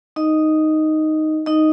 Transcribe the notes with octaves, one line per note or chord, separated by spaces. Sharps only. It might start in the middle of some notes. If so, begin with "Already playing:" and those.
D#4 D#5
D#4 D#5